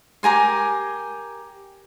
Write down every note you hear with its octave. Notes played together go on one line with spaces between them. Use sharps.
G4 A#4 G#5 C6